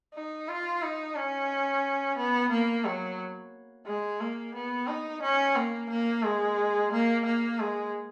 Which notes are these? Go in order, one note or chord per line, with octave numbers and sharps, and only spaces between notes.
D#4
F4
D#4
C#4
B3
A#3
F#3
G#3
A#3
B3
D#4
C#4
A#3
A#3
G#3
A#3
A#3
G#3